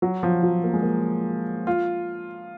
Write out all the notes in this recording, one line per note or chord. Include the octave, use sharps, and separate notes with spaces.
F#3
F3
F#3
A#3
G#3
A#3
F4